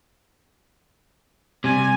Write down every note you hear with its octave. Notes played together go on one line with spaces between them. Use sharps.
C3 G3 G#5